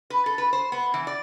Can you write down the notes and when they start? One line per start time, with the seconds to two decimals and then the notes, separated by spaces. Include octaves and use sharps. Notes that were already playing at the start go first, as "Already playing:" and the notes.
0.10 B4
0.26 A4
0.38 B4
0.53 C5
0.72 B3
0.94 E3
1.07 D5